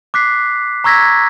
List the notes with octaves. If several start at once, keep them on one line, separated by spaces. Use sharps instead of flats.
D6 F#6 B6 C7
A#5 C#6 E6 G#6 A#6 B6